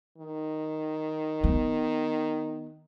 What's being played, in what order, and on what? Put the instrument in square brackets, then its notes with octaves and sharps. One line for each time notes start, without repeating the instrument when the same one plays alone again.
[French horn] D#3
[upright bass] B3